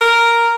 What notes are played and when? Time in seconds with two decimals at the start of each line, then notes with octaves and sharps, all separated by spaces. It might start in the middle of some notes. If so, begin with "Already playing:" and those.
0.01 A#4